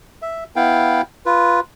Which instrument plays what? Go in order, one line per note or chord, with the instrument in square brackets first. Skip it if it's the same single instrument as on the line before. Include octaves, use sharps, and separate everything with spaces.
[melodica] E5
B3 E4 F5 G5
F4 B4